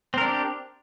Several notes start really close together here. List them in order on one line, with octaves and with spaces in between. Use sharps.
C4 A#4 D4 G4